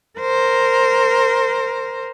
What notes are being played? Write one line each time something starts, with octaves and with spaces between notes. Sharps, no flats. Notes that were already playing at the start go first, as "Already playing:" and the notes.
A#4 C5